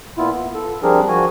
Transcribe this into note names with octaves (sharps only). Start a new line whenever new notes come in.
A#2 B3 E4 F4
B3
A4
F3 G3 C4 D4 G#4 A#4
F3 F#4 G#5